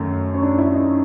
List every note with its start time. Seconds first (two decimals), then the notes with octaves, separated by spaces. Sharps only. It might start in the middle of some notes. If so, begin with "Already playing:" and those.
Already playing: F#2 D#3 A3
0.34 C#4
0.43 D4
0.58 E4
0.73 D#4